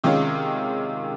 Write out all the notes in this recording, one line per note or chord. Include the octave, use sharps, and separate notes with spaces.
C3 D#3 G#3 C#4 F4